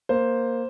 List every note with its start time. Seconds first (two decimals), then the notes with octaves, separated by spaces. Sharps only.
0.09 A#3 C5